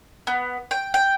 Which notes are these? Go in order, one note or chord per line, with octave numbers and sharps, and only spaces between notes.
B3
G5
G5